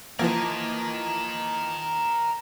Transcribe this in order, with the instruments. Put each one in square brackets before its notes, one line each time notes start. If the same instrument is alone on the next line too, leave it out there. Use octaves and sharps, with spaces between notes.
[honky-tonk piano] E3 F3 A#3 [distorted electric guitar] A#4 D#5